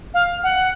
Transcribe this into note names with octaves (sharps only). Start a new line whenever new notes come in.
F5
F#5